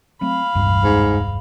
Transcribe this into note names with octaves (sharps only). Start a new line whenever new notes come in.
F#3 A3 C4 F5 B5
E1 C#2 G2
G#2